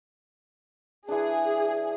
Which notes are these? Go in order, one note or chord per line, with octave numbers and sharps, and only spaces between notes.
E3 D4 G#4